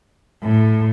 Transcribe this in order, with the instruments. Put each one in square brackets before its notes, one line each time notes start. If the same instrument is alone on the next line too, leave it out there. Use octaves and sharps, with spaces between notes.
[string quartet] A2